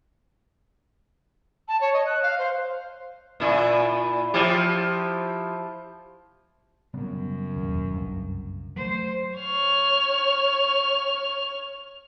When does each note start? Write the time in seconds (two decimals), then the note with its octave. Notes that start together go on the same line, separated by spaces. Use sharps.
1.68 A5
1.81 C#5
1.94 D#5
2.06 F#6
2.23 F5
2.39 C5
3.40 A#2 E4
4.34 F3 E4 G4
6.94 F#2 C#3 G3 B3
7.56 E1 D#2
7.94 F#1 C2 G2
8.76 F#3 A3 C5
9.39 C#5 F6